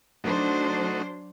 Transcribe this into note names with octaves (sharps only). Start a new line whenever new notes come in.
F#3 A3 D4 D#4 F#4 C5